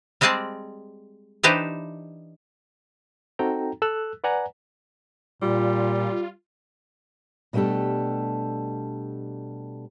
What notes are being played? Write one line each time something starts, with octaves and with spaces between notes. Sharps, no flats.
G3 G#3 C4 G#4 D5 A5
E3 D4 D#4 G4 B4 C5
C4 D#4 F#4 A4 G5 A#5
A4 E6 F#6
B4 D5 F#5 G#5 A#5
A#2 G3 F4
B2 G3 A3 D4 G4 A4